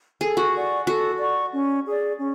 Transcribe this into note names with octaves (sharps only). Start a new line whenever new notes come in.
G#4 A4
F#4
D5 F#5 C#6
F#4 A4
D5 F#5 C#6
C#4
G#4 D5
C#4